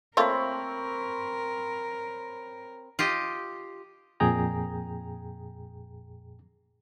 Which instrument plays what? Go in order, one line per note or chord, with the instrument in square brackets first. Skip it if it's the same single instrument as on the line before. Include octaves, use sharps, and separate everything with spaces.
[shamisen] A3 A#3 F4 [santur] C4 C#5 B5 [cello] A#4
[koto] F4 G4 D#5
[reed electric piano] F2 A#2 G#4 G5 A#5